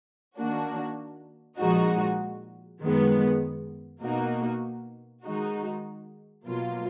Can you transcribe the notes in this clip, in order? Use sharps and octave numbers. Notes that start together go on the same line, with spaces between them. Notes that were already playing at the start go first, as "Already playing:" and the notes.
D#3 A#3 D4 F#4
A#2 F3 G#3 D#4 F#4
F#2 D#3 G#3 B3
B2 A#3 D#4 F#4
D#3 G#3 D#4 F#4
B2 F#3 A#3 F4